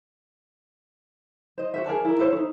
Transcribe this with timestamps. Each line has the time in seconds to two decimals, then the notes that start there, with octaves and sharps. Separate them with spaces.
1.58 C5 D#5
1.74 F#4 C5 E5
1.86 G#4 A#4 D5 A5
2.05 E4 A#4
2.19 E4 A4 C5 C#5
2.32 C#4 D#4